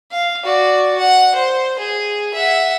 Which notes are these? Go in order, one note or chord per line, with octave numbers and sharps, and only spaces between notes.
F5
F#4 D5
F#5
C5
G#4
E5 F#5